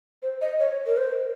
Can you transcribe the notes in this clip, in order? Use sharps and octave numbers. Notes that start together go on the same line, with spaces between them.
C5
D#5
C#5
A#4
C5